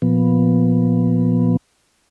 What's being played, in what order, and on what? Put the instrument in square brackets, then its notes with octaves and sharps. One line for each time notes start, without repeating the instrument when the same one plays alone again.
[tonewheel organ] A#2 F3 B3